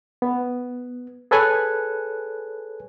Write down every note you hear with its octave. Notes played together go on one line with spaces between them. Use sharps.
B3
G#4 A4 B4 C#5 G#5 F#6